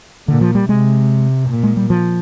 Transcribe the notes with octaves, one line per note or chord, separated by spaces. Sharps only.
A#2 D3
F3
G3
C3 G#3
A#2
G#3
G3
F3